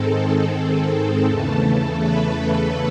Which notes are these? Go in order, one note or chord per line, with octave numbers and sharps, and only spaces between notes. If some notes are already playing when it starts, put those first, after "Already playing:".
Already playing: G#2 D#3 G#3 C4 A4
A4
E2 C#3 E3 A3
B4